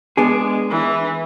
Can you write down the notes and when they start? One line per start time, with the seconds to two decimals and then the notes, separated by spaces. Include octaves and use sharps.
0.17 G#3 B3 D4 G#4
0.70 E3